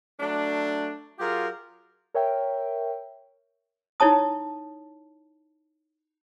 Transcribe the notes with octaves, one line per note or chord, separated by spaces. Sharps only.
F#3 A3 D4
F#3 F4 G4 G#4 A#4
A#4 C#5 E5 G5
D#4 E4 C#5 A5 D#6